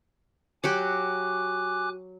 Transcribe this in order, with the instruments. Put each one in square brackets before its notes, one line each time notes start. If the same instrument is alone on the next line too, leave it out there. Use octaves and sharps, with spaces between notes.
[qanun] F#3 F#4 G4 [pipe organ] G#5 D6 F#6